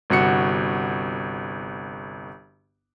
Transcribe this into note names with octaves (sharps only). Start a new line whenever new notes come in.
G1 C2 F#4 C#7